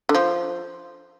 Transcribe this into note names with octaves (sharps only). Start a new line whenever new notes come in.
D3
F3